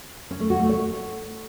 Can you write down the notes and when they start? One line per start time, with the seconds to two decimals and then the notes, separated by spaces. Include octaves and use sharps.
0.31 C#4
0.40 A3
0.50 F#4
0.60 A3
0.69 C#5